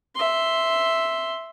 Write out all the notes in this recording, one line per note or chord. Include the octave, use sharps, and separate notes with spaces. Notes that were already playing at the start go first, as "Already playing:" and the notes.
E5 C6